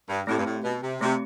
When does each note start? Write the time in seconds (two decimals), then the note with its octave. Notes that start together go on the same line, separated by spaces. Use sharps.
0.09 G2
0.27 A2 A3 C4 G4
0.39 G2
0.46 A2
0.64 B2
0.82 C3
1.01 C3 A3 C4 G4